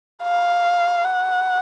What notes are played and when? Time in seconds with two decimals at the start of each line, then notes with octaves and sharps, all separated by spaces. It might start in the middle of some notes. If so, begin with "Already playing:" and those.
0.23 F5
1.05 F#5